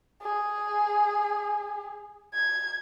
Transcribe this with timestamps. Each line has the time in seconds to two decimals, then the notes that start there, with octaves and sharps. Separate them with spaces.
0.22 G#4
2.34 G#6